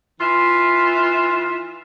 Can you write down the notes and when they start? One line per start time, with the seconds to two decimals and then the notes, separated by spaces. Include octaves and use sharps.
0.18 E3 F4 E5